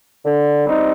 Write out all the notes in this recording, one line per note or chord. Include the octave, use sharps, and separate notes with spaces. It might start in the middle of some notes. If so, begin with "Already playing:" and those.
D3
G3 C4 D#4